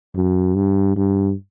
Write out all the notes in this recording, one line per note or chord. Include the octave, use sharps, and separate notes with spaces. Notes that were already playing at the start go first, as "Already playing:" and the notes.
F#2
G2
G2